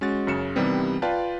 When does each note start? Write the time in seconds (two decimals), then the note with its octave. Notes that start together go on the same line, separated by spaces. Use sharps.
0.01 G#3 C#4 F#4 F#5 A6
0.27 F#2 C#3 C#7 E7
0.56 C3 D#3 E3 G3 B3 C4
1.02 F4 B4 D5 F5 G5 A5